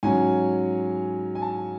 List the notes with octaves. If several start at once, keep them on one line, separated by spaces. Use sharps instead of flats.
G#2 F#3 C#4 G#5
G#5
A5